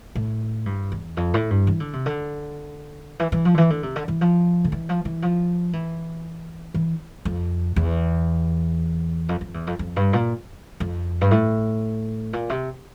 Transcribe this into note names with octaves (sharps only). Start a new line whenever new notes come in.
A2
G2
E2
F2
A2
G2
E3
D3
C3
D3
E3
E3
F3
D3
E3
D3
C3
D3
E3
F3
D3
E3
F3
E3
F3
E3
E3
F2
E2
F2
F2
E2
F2
F2
G2
A#2
F2
G2
A2
A#2
C3